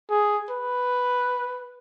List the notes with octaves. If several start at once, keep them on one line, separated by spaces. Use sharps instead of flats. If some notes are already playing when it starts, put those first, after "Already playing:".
G#4
B4